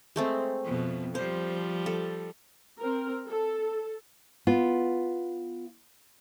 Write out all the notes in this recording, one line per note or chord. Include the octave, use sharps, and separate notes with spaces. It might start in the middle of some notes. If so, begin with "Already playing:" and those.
G#3 A3 C4
F2 B2
F3 G3 C5
A4
C4 A#4
A4
B3 F4